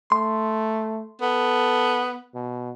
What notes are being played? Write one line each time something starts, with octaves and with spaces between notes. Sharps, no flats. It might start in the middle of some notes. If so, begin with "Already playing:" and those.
A3 C6
B3 A4
B2